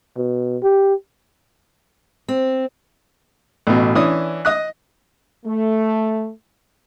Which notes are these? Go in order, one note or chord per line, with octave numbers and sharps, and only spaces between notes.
B2
G4
C4
A1 B2
E3 C#4 D4 D#6
D#5 D#6 F#6
A3